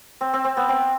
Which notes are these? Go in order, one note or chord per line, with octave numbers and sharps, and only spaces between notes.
C4
C4
C4
B3
C4